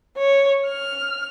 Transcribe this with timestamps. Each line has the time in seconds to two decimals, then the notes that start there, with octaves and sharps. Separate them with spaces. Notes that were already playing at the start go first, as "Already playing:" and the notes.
0.17 C#5
0.66 F6